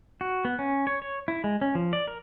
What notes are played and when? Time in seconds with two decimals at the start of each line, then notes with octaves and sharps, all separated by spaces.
0.21 F#4
0.45 B3
0.59 C#4
0.87 C#5
1.02 C#5
1.28 E4
1.44 G#3
1.61 C#4
1.75 F3
1.93 D5
2.08 A#4